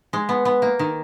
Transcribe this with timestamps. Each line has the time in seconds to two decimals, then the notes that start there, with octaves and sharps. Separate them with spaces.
0.13 G#3
0.29 B3
0.45 B3
0.62 A#3
0.79 D#3